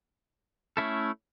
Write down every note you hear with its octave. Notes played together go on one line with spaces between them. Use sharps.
A3 C#4 E4 A4